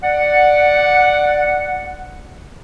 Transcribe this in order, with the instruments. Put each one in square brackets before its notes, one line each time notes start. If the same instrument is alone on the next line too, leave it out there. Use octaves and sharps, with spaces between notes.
[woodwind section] D5 F#5